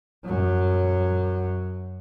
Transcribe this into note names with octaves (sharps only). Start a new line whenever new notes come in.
F#2 F#3